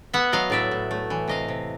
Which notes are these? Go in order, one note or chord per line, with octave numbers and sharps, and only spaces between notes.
B3 E5 F#5
F#3 D#5 F5
A2 D5 E5
A2
A3
E3
C3 D#5 F5
C3